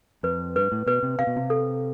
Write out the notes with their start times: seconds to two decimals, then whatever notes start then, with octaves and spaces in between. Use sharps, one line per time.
0.23 F2 B4
0.56 G2 B4
0.72 A2
0.86 B2 B4
1.03 C3
1.19 C3 F5
1.27 B2
1.36 C3
1.50 A4